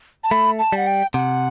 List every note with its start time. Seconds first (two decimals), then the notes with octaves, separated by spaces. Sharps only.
0.24 A5
0.31 A3 B5
0.59 A5
0.72 G3 F#5
0.87 G5
1.14 C3 F#5